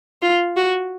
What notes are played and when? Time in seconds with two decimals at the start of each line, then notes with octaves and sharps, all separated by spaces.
0.22 F4
0.56 F#4